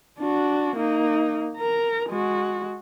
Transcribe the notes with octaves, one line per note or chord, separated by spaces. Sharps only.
D4 F#4
A#3 D#4
A#4 A#5
G#3 F#4